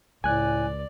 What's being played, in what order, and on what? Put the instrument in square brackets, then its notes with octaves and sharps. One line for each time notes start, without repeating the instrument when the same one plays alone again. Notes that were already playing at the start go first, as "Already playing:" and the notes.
[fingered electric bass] C#2 [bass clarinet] A2 [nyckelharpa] D5 [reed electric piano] G#5 F#6